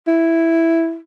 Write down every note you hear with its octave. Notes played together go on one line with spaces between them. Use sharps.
E4